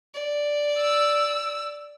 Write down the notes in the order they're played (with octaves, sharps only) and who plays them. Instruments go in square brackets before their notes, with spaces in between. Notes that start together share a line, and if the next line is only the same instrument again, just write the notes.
[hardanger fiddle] D5
[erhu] E6